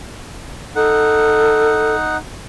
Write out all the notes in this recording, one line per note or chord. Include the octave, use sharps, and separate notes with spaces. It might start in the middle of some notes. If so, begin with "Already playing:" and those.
D#4 A4 F#5